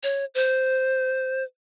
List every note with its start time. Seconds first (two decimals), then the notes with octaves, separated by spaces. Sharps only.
0.03 C#5
0.35 C5